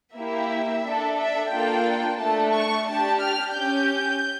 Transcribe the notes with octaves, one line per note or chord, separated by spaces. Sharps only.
A#3 E4 G4 E5
D4 A4
E5
A#3 D4 F4 A4 G5
A3 D4 A4 A5
C#6
D4 G4 A5
F6
C#4 G4 G6